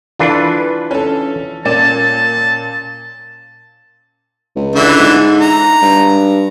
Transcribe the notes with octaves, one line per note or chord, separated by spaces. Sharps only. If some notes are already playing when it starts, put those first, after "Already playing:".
E3 D4 F4 A4 B4
C#4 A4
A#2 C#4 D5 A5 E7
C#2
D3 E3 E5
G#2
A#5
G2